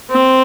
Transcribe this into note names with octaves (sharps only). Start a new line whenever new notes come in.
C4